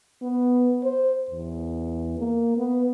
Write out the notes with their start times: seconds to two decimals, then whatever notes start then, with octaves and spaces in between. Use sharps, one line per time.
0.22 B3
0.84 C5
1.30 E2
2.19 A#3
2.57 B3